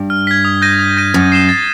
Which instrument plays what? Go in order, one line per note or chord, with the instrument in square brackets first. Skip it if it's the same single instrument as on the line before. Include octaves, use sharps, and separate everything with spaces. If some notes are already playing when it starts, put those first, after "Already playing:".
Already playing: [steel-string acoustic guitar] G2
[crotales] F6
G#6 B6
D#6
G6 A#6 D#7
D#6
G6 A#6 D#7
[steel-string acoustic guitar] F#2 [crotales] A6
[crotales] C7 E7 G7
A6